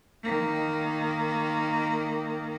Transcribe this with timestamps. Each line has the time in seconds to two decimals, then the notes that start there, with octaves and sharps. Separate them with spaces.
0.23 D#3 A#3